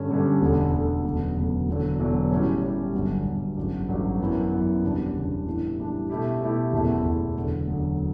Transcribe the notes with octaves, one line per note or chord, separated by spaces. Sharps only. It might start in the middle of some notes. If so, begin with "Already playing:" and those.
Already playing: G2 D3 G3 C#4
G2 D3 G3 C#4
E1 D2 D3
E1 D2 D3
E1 D2 C#3 F#3 B3
E1 D2 C#3 F#3 B3
E1 E2 D3 F#3
E1 E2 D3 F#3
A2 G3 C#4
A2 G3 C#4
G1 G2 F#3
G1 G2 F#3
A1 G2 F#3
A1 G2 F#3
F#2 E3 B3
F#2 E3 B3
E1 E2 C#3 G3 D4
E1 E2 C#3 G3 D4
A2 E3 G3 D4
A2 E3 G3 D4
B2 A3 E4 G4
B2 A3 E4 G4
F#1 E2 B2 A3 E4
F#1 E2 B2 A3 E4
E1 D2 D3 F#3
E1 D2 D3 F#3